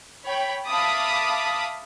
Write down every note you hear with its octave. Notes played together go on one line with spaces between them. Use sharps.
C#5 G5 B5
E5 F5 A5 B5 D6 D#6